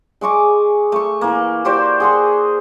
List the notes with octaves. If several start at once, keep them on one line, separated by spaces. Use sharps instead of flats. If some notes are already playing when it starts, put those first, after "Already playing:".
G#3 G#5 C#6 D6
A3 C#6
E3 A#3
F#4 G4 C5 D5
G#4 F#5 C6